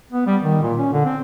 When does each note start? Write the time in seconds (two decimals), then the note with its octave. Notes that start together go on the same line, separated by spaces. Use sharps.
0.12 B3
0.26 G3
0.42 D#3
0.63 A#2
0.78 C#4
0.92 D3
1.05 C4